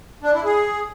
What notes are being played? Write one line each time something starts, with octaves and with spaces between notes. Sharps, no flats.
D4
E4
G#4